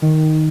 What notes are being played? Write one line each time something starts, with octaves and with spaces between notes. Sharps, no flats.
D#3